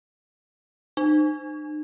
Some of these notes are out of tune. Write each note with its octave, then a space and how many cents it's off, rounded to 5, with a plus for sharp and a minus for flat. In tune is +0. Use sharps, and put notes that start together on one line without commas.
D#4 -45